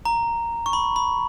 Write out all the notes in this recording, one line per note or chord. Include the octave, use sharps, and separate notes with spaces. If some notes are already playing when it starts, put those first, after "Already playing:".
A#5
C#6
B5
B5